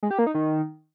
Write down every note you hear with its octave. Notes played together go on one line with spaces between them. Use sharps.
G#3
G4
A#3
D#4
D#3